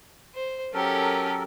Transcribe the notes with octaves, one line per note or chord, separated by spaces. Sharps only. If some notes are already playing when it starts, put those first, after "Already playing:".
C5
F#3 C#4 G4 A4 A#4